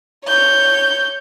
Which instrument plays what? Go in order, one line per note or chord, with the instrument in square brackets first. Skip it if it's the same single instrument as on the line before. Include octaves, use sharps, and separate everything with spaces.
[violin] C#5 G6